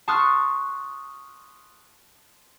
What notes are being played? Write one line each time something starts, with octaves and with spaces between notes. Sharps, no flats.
A5 C6 C#6 D#6 F6 F#6